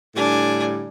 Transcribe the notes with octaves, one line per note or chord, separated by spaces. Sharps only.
A2 D3 G3 D4 G#5